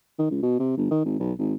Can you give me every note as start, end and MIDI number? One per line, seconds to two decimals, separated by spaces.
0.19 0.29 51
0.31 0.39 37
0.43 0.59 47
0.59 0.73 48
0.77 0.87 31
0.91 1.02 51
1.05 1.18 32
1.20 1.33 35
1.39 1.54 32